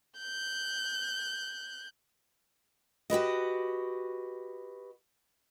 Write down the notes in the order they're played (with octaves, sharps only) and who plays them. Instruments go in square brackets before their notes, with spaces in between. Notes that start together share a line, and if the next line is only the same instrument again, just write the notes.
[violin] F#6 G6
[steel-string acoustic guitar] F#4 G4 B4 D#5